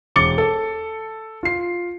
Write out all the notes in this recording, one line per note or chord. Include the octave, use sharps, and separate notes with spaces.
E1 D6 A6 C#7 G7
A4
F4 C7